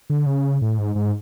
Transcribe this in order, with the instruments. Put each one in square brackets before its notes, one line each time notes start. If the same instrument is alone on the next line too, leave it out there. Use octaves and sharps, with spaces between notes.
[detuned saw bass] D3
C#3
A2
G#2
G#2